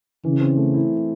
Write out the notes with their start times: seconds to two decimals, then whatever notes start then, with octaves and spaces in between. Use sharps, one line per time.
0.25 C#3 E3
0.41 C4
0.57 A3
0.74 E4